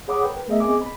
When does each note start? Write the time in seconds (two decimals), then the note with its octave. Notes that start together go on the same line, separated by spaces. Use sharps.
0.08 G#4 C#5 F#5 B5 D6 D#6
0.23 A#4 B4 G5
0.48 A3 B3 G#4 A#4 D#5 E5
0.60 B3 C4 G#4 D#5 G#5 D6
0.82 B5